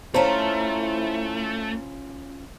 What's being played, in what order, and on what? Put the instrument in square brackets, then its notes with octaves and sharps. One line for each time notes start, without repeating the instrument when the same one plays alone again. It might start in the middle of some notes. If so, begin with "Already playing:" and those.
[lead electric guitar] A3 [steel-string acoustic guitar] C#4 F4 [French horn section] E4 [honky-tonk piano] C5 A5 A#5